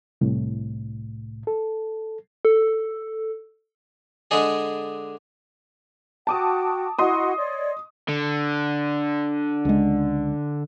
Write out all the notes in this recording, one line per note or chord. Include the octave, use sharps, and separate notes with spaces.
C2 A2
A4
A4
D3 G#3 D4 G#4
F#4 G5 A5 D6 D#6
E4 F#4 D#5 F#5 C6 D#6
C#5 D5
D3
C#2 G#3